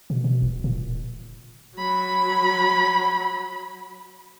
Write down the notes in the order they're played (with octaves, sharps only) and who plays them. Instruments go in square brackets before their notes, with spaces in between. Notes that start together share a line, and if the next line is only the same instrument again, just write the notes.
[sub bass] B2
B2
D#1
A#2
[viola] F#3 B5